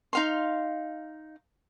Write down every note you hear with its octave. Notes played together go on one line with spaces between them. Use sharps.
D#4 F5 C6